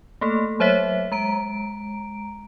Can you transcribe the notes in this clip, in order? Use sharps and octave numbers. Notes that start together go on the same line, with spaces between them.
A3 A#3 A4
F#3 C5 C#5 E5 B6
G#3 A#5 D7